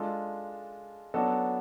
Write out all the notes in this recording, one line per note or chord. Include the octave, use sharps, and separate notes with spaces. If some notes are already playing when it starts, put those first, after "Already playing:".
Already playing: G#3 D4 F4 A4
F#3 B3 D4 F#4 A4